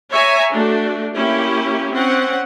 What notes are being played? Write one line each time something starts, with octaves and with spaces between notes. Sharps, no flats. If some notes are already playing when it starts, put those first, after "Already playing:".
C#5 E5 G#5 A#5
A3 D4 F#4
A#3 C#4 E4 G4
C4 C#4 F#5